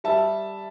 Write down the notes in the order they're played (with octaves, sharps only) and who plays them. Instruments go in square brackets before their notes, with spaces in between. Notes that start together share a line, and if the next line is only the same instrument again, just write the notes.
[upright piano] G3 E5 A5